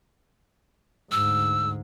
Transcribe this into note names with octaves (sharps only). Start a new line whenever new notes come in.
D2 G#2 E6